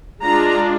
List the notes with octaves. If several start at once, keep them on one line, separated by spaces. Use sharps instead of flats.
G#3 D4 F4 A#5